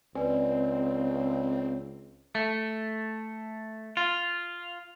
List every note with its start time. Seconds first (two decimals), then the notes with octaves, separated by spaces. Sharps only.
0.15 C#2 C4 B4 D5 G#5
2.35 A3
3.97 F4